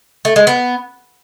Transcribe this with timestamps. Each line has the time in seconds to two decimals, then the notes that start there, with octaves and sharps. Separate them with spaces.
0.25 A3
0.36 G#3
0.47 B3